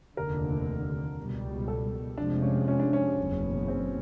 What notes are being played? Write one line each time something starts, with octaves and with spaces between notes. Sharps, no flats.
F1 D#2 D3 A#4
C#2 B2 G3
A4
F1 F2 C3 F3 G#3 D4
C#4
C#4
D4
C#4
F#1 E2 B2
C4